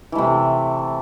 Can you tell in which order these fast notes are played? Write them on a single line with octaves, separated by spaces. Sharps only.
E3 A3 C3